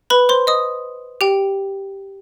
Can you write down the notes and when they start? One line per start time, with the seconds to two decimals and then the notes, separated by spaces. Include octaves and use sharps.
0.10 B4 B5
0.29 C5 C6
0.47 D#5 D#6
1.21 G4 G5